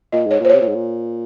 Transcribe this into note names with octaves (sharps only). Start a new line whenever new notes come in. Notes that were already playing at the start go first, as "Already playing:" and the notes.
A#2 D#5
G#2 C#5
A#2 C5
C3 C#5
A#2
G#2
A#2